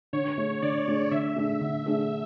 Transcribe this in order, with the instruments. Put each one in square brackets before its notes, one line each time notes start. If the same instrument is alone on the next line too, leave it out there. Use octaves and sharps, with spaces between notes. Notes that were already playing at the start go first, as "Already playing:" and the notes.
[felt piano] D3 [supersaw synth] C#5
[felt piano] A3 D4 G#4
[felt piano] D3 [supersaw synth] D5
[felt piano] A3 D4 G#4
[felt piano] D3 [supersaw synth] E5
[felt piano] A3 D4 G#4
D3
A3 D4 G#4